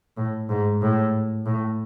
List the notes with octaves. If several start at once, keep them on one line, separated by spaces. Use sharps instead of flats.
A2
G#2
A2
A2